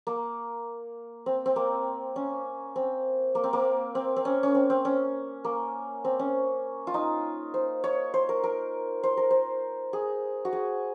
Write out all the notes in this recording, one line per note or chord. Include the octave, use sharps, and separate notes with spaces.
A#3
C4
C4
A#3
C#4
C4
A#3
C4
A#3
C4
C4
C#4
C#4
C4
C4
C#4
A#3
C4
C#4
F4
D#4
C5
C#5
C5
A#4
A#4
C5
A#4
C5
G#4
F#4
G#4